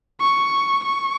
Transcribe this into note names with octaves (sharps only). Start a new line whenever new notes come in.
C#6
C#6